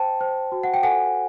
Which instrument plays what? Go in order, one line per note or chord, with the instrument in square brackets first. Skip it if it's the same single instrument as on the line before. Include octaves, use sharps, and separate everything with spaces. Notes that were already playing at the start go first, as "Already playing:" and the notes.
Already playing: [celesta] C5 G5 A5
C5
F#4
F#5
G5
A4 F#5 G#5